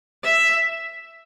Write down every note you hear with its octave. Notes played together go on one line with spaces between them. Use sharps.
E5